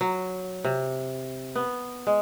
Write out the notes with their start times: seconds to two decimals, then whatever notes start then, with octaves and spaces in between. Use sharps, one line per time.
0.01 F#3
0.64 C3
1.55 B3
2.07 G#3